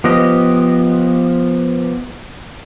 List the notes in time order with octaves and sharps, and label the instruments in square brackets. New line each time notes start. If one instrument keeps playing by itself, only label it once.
[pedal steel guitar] F3 B3 G4 D#5